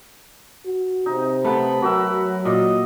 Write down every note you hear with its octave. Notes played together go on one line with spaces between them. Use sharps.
F#4
C3 D#4
A3 B3 B5
F#3 F#4 A#4 E5
F#3
A#2 D#5